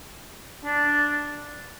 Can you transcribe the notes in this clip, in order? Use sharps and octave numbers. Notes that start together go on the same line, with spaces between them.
D4